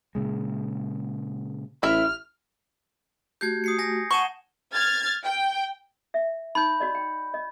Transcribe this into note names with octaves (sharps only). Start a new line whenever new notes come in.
A#2 C#3 G#3
A1 E4 E5 F6
A3 F#4 G4 G6 G#6
D#6 C7 C#7
G#5 A#6
F#5 A5 C#6 E7 G7
F6 G#6 A6
G5
E5
D#4 B5 G6
F#4 D5 D#5
G5
D#5